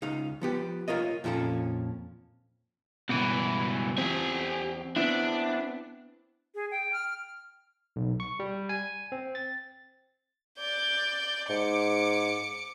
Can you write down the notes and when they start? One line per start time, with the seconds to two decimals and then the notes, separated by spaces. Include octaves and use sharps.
0.02 C#2 D#4 F5
0.41 F3 B3 G4
0.88 F4 A#4 C#5 D#5
1.24 F2 A#2 F3 C#4 A4
3.09 C#2 G2 B2 E3
3.98 E2 C4 G4 G#5
4.96 B3 C4 D4 E4
6.55 G#4
6.71 G5
6.93 F6
7.96 B1
8.20 C#6
8.40 G3
8.69 G#5
9.12 C4
9.35 A6
10.60 D5 G6
11.49 G#2 D6 C#7